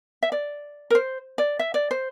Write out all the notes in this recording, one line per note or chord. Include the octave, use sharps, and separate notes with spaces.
E5
D5
A#4
C5
D5
E5
D5
C5